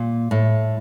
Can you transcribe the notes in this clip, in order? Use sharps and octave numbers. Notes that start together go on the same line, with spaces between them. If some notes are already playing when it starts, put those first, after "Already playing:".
Already playing: A#2
A2